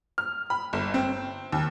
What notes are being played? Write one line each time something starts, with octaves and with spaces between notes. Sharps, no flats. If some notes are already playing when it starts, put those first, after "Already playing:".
F6
B5
G1
C4
D#2